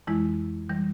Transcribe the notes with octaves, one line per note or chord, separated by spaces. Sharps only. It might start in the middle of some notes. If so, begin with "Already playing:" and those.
F2 E3 G#3 E4
E3 G3